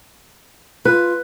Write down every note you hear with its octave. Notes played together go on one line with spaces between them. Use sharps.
F4 B4